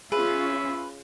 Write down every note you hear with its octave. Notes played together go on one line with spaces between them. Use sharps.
C#4 F4 G#4 B4 E5